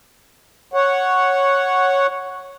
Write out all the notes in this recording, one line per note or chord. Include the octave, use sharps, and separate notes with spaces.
C#5 F#5